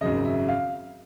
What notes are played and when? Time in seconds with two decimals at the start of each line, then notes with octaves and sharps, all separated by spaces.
0.01 G#1 F#2 C#3 D#5
0.25 E5
0.48 F5